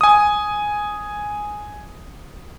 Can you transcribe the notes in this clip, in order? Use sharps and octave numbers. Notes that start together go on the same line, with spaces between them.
G#5 D#6